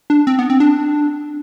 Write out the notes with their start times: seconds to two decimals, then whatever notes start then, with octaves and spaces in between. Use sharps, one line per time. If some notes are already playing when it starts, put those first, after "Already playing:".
0.10 D4
0.27 C4
0.39 B3
0.50 C4
0.60 D4